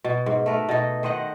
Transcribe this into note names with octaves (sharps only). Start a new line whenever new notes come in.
B2
G#2
A3 A#4 B4
B2 D#4
D#3 C5 D#5 F#5